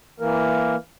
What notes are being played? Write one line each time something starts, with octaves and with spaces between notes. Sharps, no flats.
E3 A#3 A#4